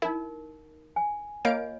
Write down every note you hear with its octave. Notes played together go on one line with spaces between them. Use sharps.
D#4 E4 A#4
G#5
A#3 F4 C#5 D#5 F5 D7